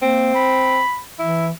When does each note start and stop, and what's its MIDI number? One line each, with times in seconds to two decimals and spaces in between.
0.02 0.33 58
0.02 0.80 60
0.35 1.00 83
1.19 1.51 52
1.19 1.47 64